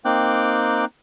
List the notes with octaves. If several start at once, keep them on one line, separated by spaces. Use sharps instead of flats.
A#3 C4 D#4 G5 D6 F#6